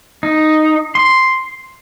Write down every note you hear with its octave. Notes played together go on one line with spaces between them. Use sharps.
D#4
C6